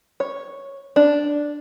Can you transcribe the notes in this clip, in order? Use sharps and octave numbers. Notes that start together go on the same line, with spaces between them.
C#5
D4